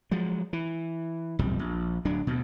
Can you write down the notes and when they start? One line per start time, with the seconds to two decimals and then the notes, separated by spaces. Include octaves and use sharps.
0.11 F3 F#3 G#3
0.53 E3
1.39 D#1 B1 F2 G3
1.59 A#1
2.05 D1 F#3 D4
2.27 D2 B2